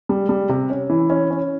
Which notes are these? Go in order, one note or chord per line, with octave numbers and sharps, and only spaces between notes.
G3
G3
C3
C#4
E3
C#4
C#4